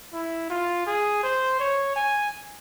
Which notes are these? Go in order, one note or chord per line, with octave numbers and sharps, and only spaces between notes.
E4
F4
G#4
C5
C#5
G#5